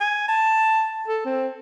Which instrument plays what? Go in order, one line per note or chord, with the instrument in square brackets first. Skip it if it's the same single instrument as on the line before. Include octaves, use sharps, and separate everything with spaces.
[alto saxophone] G#5
A5
A4
C4